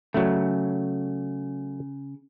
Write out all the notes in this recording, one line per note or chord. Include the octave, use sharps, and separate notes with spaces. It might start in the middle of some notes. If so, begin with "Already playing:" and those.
C#3 F#3 A3